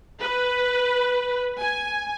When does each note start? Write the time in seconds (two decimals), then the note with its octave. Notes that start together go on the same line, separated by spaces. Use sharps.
0.20 B4
1.60 G#5